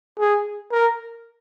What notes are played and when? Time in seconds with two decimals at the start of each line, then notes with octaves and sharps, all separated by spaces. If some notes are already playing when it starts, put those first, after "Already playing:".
0.19 G#4
0.72 A#4